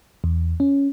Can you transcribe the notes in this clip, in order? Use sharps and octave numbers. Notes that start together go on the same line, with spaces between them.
E2
C#4